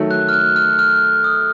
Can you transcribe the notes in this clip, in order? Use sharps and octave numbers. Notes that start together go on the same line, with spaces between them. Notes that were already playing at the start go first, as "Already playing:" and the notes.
Already playing: D#3 F#3 A3
F#6
F6
F#6
F6
F6
D#6